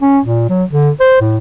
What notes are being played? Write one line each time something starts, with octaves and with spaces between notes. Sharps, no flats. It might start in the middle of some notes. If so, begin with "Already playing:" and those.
C#4
A#2
F#3
D3
C5
A2